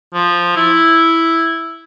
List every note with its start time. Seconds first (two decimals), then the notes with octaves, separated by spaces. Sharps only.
0.14 F3
0.57 E4